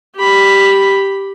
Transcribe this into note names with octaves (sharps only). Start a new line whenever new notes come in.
G4 B5